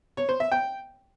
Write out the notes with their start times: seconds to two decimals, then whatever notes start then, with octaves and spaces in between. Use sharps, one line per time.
0.17 C#5
0.29 C5
0.40 E5
0.52 G5